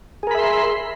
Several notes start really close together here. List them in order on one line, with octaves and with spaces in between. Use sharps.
G#4 A#4 B5 E5 C6